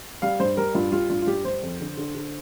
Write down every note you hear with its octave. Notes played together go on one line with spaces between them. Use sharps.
G3 F5
G2 C5
G3 A#4
G2 F4
G3 F4
G2 F4
F4
G2 G4
G3 C5
F2
D3
D3
D3